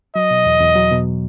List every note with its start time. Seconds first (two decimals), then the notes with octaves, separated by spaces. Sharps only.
0.15 F#3 D#5
0.31 B2
0.46 E2
0.60 E2
0.76 F#3
0.91 B2